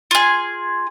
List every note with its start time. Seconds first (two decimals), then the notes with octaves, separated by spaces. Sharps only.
0.11 F4 G#4